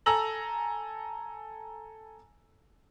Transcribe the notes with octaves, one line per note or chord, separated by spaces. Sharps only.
A4 G#5 A#5 E6 A#6 F#7